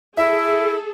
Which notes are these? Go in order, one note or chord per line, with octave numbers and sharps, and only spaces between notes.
E4 G#4 A4 E5